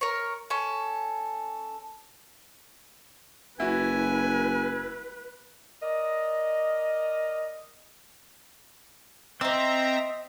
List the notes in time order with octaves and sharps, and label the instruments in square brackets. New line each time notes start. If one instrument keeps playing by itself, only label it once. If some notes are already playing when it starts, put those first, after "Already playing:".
[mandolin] A#4 C#5
C#4 A4
[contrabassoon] F#1 [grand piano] E4 F#4 [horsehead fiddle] B4 [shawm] G#5
[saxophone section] A#4 D5 D#5
[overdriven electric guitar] C4 [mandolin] C5 E6 [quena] D#5 [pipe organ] E5 A#5